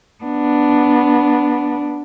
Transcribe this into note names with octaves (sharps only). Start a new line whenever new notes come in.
B3 D4